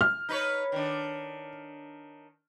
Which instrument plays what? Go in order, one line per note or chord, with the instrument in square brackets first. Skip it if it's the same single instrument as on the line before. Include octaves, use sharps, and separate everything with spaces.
[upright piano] F6
[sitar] D#4 B4 C#5
D#3 D4